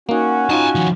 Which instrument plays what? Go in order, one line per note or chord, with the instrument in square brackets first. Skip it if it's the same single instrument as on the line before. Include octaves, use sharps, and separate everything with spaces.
[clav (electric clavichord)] A#3 D#4 [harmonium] C#4 F#4
[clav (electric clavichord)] D#4 F4 [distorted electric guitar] G#5 A5
[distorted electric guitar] D#3 F3